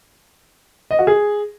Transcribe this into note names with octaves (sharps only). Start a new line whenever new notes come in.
D#5
F#4
G#4